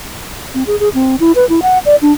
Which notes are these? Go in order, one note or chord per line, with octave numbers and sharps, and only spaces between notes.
C4
G#4
G#4
C4
E4
B4
E4
F#5
D5
D4